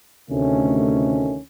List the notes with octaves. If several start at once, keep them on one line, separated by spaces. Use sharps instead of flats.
D2 C3 D#3 A3 C#4